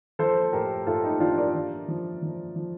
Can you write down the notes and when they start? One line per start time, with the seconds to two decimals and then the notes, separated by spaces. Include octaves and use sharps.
0.19 F3 A4 C5
0.53 A2 G4 A#4
0.87 A2 F4 A4
1.04 D#4 G4
1.20 F3 D4 F4
1.37 A#4 D5
1.54 F3
1.88 F3
2.22 F3
2.56 F3